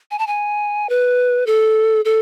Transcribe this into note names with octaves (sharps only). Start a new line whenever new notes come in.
G#5
A5
G#5
B4
A4
A4